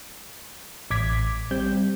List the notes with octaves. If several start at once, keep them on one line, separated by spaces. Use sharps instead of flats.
A1 D6 G#6 B6
G3 C4 G6